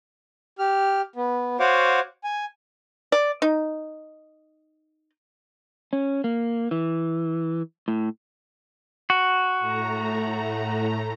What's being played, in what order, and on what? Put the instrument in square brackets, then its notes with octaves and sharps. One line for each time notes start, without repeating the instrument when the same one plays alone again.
[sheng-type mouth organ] G4 F6
B3
F#4 C5 C#5 F5 F#5 D6
G#5
[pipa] D5
D#4
[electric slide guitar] C#4
A#3
E3
A2
[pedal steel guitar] F#4
[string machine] A2 A3 A#5